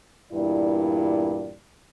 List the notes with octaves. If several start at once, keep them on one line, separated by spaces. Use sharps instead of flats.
E2 G2 A#2 E4 D5